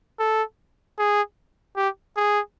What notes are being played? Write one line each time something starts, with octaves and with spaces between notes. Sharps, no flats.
A4
G#4
G4
G#4